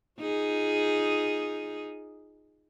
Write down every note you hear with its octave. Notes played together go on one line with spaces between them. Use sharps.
D#4 F4 G#4